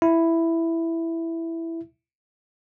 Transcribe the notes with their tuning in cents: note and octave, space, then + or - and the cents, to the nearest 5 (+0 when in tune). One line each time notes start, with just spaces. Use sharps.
E4 +5